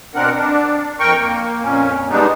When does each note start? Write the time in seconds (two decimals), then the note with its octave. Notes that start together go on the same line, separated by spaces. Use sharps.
0.15 B2 C4 D4 A#4 F#5
0.35 D4
1.00 F2 A#4 G5 C#6
1.18 A#3
1.63 F2 A#2 C#4
2.09 G3 G#3 B3 D4 D#4